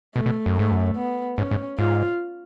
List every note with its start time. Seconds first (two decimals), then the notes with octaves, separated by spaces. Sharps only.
0.15 B2 A3
0.26 B2
0.46 F#2
0.56 G#2 A3
0.71 F#2
0.97 B3
1.38 G#2 C#4
1.51 G#2
1.79 G#2 F4